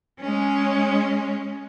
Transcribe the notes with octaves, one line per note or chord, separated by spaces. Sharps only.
G#3 C#4